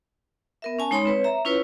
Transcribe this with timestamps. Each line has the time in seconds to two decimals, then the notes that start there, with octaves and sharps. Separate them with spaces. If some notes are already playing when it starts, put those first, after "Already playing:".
0.62 B3 A#4 E5
0.79 C#4 G#5 A5
0.91 G#3 D#4 C#5 B5 C6
1.05 C4 B4 C#5
1.24 E5 A#5
1.45 C#4 E4 F4 B4 C#5